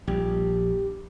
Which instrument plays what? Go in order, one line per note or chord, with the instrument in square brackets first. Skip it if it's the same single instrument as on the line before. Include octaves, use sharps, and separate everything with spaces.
[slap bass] A#1 [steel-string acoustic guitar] G3 D4 G4